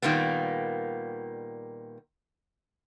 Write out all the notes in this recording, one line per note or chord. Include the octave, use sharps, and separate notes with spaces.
A#2 D#3 G3 A#3 B3